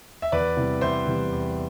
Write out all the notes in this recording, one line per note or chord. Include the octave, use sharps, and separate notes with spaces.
E5
E2 B4 D5
C3 E3 G3
E2 C5 E5
C3 E3 G3
E2